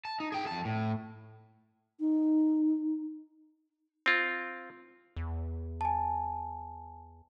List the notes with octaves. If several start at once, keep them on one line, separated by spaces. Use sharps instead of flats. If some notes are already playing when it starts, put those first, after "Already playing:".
A5
D#4
G#4 G5
F2 A5
A2
D#4
C4 F4
E2
G#5 A5